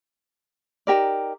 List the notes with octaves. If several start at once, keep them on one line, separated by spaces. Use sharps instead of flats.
D#4 G4 A#4 D5